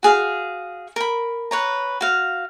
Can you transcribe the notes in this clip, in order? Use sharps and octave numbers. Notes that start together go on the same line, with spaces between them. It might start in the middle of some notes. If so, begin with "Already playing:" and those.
F#4 G#4 F5
A#4 B5
B4 C#5 A#5
F#4 F5